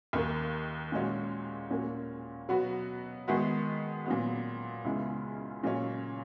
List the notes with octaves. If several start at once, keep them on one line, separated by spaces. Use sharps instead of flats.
D#2 D#3 A#3
A#2 G#3 C#4 F#4
A#2 A#3 C#4 F#4
B2 F#3 B3 F#4
D#3 G#3 B3 F#4
A#2 F#3 B3
C#2 C#3 G#3 B3 E4
A#2 F#3 C#4